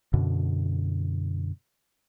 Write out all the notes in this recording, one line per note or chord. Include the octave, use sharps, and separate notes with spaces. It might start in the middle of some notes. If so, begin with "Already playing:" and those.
F#2 B2 D3